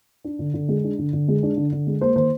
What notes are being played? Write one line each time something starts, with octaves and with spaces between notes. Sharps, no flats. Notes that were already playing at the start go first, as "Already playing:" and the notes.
D4
D3
D3
G#3
D4
D3
D3
G#3
D4
D3
D3
G#3
A#3 C5
D#3 C5